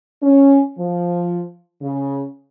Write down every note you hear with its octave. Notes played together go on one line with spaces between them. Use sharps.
C#4
F3
C#3